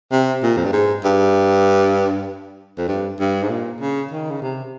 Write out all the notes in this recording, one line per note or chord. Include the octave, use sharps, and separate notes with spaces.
C3
A#2
F2
G2
G#2
G2
F2
G2
G2
G#2
A#2
C#3
D#3
C#3
C3